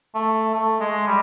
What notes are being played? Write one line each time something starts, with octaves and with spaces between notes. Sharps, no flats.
A3
A3
G#3
G3